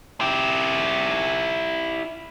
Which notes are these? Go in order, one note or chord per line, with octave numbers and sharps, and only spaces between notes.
E4 G4